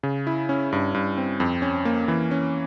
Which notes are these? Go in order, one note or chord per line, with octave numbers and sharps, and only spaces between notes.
C#3
E4
C#4
G2
G2
C4
F2
C#4
A#3
E3
C#4